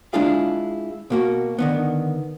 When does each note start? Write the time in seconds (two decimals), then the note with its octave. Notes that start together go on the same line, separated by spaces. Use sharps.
0.13 G#3 D4 E4 F4 G#4 F5
1.10 B2 A#3 F#4
1.59 D3 D#3 B3